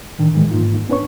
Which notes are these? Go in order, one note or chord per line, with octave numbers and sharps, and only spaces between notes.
A2 D#3 D4
A2 D#3 E3 G3 G#3
G#2 A#3 D#4 F4
B3 C#4 D4 B4 C#5 C#6